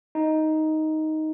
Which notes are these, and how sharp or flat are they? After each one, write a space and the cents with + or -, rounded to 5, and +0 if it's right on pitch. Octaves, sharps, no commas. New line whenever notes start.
D#4 +5